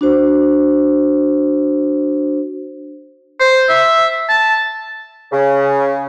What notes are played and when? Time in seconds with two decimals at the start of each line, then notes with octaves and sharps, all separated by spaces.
0.01 D4 F#4 C5
3.40 C5
3.69 E5
4.29 A5
5.32 C#3